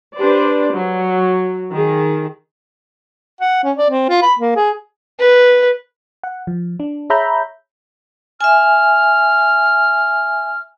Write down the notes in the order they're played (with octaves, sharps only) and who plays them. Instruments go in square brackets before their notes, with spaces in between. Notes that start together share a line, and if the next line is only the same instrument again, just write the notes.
[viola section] D4 G4 B4 C5 D5
F#3
D#3 G#4
[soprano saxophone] F#5
C#4
D5
C4
F4
B5
A#3
G#4
[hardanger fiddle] B4
[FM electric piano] F#5
F3
D4
G#4 C#5 E5 A#5 B5 G6
[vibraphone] E5 G#5 [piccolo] F6